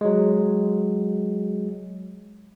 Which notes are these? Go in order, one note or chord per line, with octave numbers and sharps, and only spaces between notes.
F#3 G#3